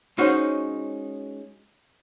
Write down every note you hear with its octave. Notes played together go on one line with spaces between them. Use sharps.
G#3 C#4 D#4 F#4 C5 C#5